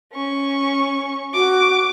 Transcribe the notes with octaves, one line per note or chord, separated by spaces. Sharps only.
C#4 C#6
F#4 D6